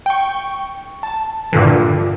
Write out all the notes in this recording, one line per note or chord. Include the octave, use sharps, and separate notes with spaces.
G5 C#6
A5
G2 A#2 D3 E3